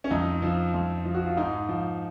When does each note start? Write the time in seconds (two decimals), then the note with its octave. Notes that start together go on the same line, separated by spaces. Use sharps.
0.04 C#4
0.11 F2 D#4
0.42 F3
0.74 F2
1.05 F3
1.14 F#4
1.26 F4
1.37 G#2 D#4
1.69 F3